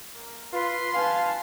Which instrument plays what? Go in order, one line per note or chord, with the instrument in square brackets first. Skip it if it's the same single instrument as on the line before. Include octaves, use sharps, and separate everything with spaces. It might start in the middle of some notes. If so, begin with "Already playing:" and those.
[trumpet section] A#3
[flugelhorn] F4 [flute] B4 [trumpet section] C6
[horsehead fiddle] B4 A5 [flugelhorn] F5 [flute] G#5